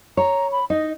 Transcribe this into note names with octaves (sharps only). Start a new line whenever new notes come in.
C#5 A#5
B5
D#4 D#5